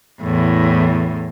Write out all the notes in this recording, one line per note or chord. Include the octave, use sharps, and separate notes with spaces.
E2 A2